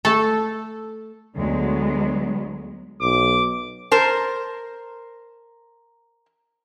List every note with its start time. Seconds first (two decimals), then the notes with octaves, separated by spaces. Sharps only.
0.05 A3 A4
1.36 D2 F#3 G#3 B3
3.02 B1 D6
3.91 A#4 C5 A5